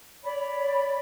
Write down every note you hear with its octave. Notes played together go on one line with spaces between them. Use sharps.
C#5 D5 B5